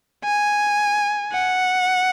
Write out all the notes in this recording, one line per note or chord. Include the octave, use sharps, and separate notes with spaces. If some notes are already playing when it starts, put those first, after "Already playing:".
G#5
F#5